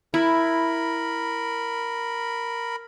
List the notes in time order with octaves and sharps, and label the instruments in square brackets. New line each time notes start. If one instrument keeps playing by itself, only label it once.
[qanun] E4 [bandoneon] A#4 B5